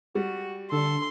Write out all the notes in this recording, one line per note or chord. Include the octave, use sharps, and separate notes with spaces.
G3 F#4
D3 A4 C6